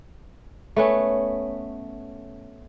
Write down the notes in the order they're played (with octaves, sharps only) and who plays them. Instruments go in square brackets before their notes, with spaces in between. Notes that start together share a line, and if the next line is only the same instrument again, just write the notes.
[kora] A3 B3 C#4